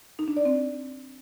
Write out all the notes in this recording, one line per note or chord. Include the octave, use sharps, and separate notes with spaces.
D#4
D4
D5
C4